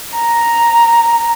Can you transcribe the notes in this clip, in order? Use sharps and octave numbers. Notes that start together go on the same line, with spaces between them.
A#5